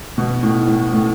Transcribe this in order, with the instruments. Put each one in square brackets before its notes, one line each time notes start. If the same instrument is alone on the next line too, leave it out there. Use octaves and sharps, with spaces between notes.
[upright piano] B2
A2
A2
A2